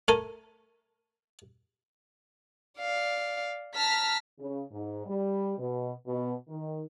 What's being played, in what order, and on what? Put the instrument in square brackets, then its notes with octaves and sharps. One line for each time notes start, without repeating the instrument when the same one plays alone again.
[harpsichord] A3 A4 A#4 G#5
[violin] D5 F5
[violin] A5 A#5 [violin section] F6 B6
[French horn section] C#3
G#2
G3
B2
B2
D#3